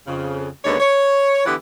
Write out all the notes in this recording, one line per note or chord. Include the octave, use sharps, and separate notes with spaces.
F2 C#3
D#2 D3 G#3 B3 C#5
C#5
D3 E3 B3 E4 G4 F#5